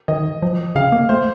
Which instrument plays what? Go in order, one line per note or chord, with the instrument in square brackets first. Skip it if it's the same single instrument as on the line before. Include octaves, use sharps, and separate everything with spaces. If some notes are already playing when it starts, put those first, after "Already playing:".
[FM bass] D#3 [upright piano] D#5
[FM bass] F3
[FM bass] C#3 [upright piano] F5
[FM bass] A#3
[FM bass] A3 [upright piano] C5